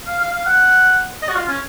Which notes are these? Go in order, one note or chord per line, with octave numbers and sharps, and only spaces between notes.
F5
F5
F5
F#5
D#5
F#4
F4
C#4